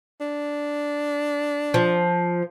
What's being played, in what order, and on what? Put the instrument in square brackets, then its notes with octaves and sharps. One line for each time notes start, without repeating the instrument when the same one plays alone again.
[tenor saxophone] D4
[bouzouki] F3